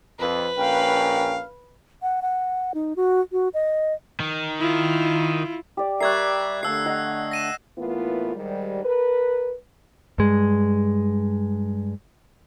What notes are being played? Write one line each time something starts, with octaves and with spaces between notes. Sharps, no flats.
F2 B4
A#1 C#4 A#4 F5 G5
F#5
F#5
D#4
F#4
F#4
D#5
D#3
E4 F4
G4 D5
G3 A#4 D5 E5 C#6 F#6 G#6 C7
D3 A3 F5 A5 E6 C7
D#5 F#5 A#5
A#6 D#7 E7
A2 E3 A#3 B3 F4
G#2 D#3 G3
A#4 B4
G2 G#3